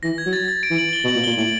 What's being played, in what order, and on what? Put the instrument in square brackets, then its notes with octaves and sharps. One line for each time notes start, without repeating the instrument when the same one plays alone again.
[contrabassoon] E3 [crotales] A#6
[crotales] G#6
[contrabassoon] F#3
[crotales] A6
A6
D7
[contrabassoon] E3
[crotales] F#7
F#7
G7
[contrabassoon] B2
[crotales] F#7
[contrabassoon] A#2
[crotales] G7
[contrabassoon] A#2
[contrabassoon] A2 [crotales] F#7